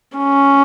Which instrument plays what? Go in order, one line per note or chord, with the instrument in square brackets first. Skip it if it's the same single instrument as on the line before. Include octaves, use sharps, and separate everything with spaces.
[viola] C#4